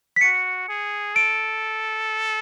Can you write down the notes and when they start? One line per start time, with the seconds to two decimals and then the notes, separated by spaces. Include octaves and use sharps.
0.16 B6
0.21 F#4 C#7
0.69 G#4
1.15 A4 D7